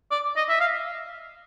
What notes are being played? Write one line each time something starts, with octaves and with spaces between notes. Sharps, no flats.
D5
D#5
E5
F5